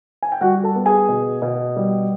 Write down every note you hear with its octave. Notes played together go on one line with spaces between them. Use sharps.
G#5
G5
G3 F#4 F#5
A4 A5
B3
G#4 G#5
B2
B2
G3